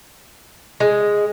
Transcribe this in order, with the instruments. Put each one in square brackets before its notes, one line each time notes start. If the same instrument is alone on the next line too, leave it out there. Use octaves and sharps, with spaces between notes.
[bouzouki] G#3